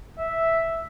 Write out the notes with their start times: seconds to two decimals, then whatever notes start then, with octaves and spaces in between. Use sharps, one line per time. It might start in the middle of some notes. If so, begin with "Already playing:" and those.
0.19 E5